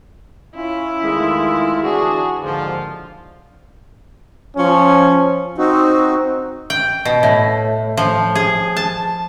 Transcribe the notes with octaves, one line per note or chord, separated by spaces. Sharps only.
C#4 E4 F4
E2 D#3 G#3 A3 F4
D3 E3 D4 F#4 G#4
D#2 G#2 D3 F3 F4
F3 C#4
C4 D#4 F#4
G5
B2
A2
F3
G#4
A5